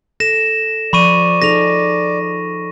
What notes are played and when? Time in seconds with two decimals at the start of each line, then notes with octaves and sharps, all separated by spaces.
0.20 A4 A#6 E7
0.93 F3 D5 B5 C#6 D#7
1.42 D#4 G#4 A4 A#6 F7